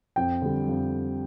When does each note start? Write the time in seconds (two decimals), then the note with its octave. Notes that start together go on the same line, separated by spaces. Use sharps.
0.16 F2 G5
0.42 D3 G3
0.68 F2